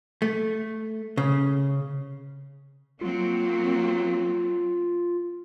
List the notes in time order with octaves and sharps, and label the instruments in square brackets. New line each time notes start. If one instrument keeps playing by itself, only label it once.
[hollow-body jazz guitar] A3
C#3
[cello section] F#3 A#3 C4 [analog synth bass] F4